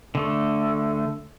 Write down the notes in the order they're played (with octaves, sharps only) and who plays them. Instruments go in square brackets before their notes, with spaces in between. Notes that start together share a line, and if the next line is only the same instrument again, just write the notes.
[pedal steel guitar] D3 A3